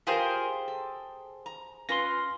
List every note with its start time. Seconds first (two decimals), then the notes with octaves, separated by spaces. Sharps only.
0.07 F4 G4 G#4 A#4 C5
0.68 A4
1.46 A#5
1.89 C#4 F4 B4 C6 A#6